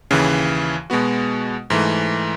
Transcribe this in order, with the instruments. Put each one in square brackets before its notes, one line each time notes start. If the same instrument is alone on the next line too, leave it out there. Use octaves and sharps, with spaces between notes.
[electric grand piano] D#2 C#3 E3
B2 G#3 B3 F#4
G#2 E3 A3